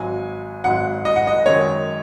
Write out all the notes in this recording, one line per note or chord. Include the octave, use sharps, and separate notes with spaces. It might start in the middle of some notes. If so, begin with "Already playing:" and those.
Already playing: G#1 G#2 F#3 G#5
G#1 G#2 F#3 F#5
D#5
F#5
D#5
F#2 D#3 G#3 C#5